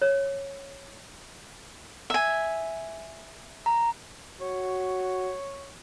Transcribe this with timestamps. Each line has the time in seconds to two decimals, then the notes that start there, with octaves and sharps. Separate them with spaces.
0.02 C#5
2.10 E5 G#5
3.66 A#5
4.41 F#4 C#5